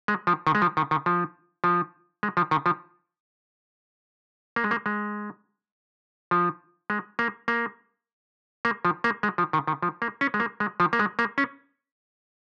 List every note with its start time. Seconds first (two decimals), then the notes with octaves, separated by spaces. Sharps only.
0.08 G#3
0.27 F3
0.47 D#3
0.55 G#3
0.62 F3
0.77 D#3
0.91 D#3
1.06 F3
1.64 F3
2.23 G#3
2.37 F3
2.51 D#3
2.66 F3
4.56 A#3
4.64 G#3
4.71 A#3
4.86 G#3
6.31 F3
6.90 G#3
7.19 A#3
7.48 A#3
8.65 A#3
8.85 F3
9.04 A#3
9.23 G#3
9.38 F3
9.53 D#3
9.67 D#3
9.82 F3
10.02 A#3
10.21 C#4
10.34 G#3
10.40 A#3
10.60 G#3
10.80 F3
10.93 A#3
10.99 G#3
11.19 A#3
11.38 C#4